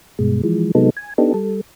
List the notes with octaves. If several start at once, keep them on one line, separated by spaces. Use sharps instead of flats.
G2 B2 G#3
E3 F3 G#3
C3 F#3 G#3 B3 D#4 A4
G#5
B3 D4 D#4 G4 A4
G3 A4